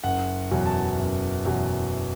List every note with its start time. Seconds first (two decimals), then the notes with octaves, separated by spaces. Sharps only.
0.04 F#1 F#5
0.51 E2 B2 F#3
0.66 A5
0.99 F#1
1.45 E2 B2 F#3